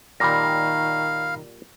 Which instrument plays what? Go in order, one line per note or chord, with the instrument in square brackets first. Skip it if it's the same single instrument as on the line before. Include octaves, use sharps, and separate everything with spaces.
[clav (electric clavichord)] A#2 G3 [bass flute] D#3 [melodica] F5 [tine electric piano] B5 A#6